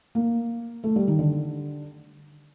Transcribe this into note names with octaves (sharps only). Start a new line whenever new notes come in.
A#3
A3
G3
D#3
D3